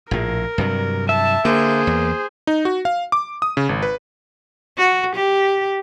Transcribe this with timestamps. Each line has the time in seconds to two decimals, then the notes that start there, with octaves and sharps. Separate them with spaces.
0.11 A#1 A2 A#4
0.58 G2 C3 F#3
1.09 E5 A5
1.45 D3 A#3 G#4 C5
1.87 E2
2.47 D#4
2.65 F#4
2.85 F5
3.12 D6
3.42 D#6
3.57 C#3
3.69 G#1
3.82 B4
4.78 F#4
5.15 G4